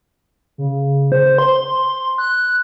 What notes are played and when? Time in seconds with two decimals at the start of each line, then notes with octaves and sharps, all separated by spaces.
0.58 C#3
1.12 C5
1.38 C6
2.18 F#6